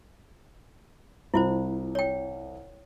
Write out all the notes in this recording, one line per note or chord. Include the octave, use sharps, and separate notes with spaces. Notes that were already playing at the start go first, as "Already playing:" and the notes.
C2 E4 F4 C5
C#5 G5